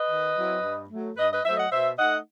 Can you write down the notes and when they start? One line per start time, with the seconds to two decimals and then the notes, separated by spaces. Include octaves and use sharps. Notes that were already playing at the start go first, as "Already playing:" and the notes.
Already playing: B4 D#5
0.10 D#3
0.37 F#3 C4 E4
0.63 G2
0.90 F#3 A3
1.17 G2 B4 D#5
1.31 B4 D#5
1.44 F#3 A3 C5 E5
1.57 D#5 F#5
1.71 B2 C5 E5
1.98 A3 D#4 D#5 F#5